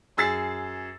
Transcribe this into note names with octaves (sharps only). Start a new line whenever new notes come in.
F#2 G#4 E6 A6 C7